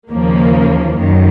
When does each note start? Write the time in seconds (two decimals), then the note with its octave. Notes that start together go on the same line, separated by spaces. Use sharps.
0.10 D#2 C#3 F3 A#3
0.99 F#2 D#3